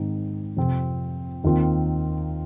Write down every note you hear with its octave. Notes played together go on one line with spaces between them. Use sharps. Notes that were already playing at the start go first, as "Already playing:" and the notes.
Already playing: G#2 D#3 C4 D#4
F2 C3 F3 C4 F4
D#2 D#3 C4 F4